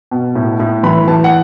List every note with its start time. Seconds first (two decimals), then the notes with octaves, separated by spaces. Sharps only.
0.11 B2
0.35 A2
0.60 A2
0.83 E3 B5
1.07 E3 A5
1.24 F#5